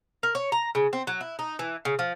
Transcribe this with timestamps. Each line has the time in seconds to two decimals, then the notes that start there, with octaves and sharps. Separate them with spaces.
0.23 A#4
0.35 C#5
0.52 A#5
0.75 C#3
0.93 C4
1.07 F#3
1.21 E4
1.39 D#4
1.59 E3
1.85 C#3
1.99 F3